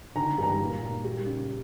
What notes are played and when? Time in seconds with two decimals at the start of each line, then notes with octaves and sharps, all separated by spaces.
0.15 D3 A#5
0.38 G2 A#5
0.60 A#2
0.83 A#2
1.05 G3
1.26 C#3